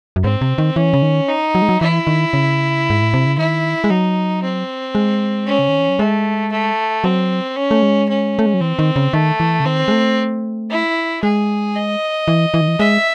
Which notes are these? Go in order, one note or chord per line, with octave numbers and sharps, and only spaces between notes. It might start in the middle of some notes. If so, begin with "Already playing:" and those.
F#2
G#2 C4
C3
D#3
E3 C#4
C#3
D#3
D#4
F#3
G#3
F#3
E3 E4
D#3
C#3
G#2
A2
C3
C#3
D#3 E4
G#3
F#3 D#4
C4
G#3
C#4
C#3
D#3
E3
F#3
G#3 A3
A3
F#3 C4
C#4
A3
G#3
C#4
A3
G#3
F#3
E3 C4
D#3
C#3
D#3 A3
E3
C#3
D#3 C4
G#3
A3
E4
G#3 G#4
D#5
E3
E3
D#3
E3
G#3 E5